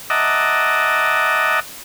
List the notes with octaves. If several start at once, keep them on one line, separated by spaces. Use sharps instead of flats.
D#5 E5 F#5 A5 A#5 D6